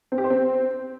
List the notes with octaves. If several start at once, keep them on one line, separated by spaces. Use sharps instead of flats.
C4
G4
C5
C4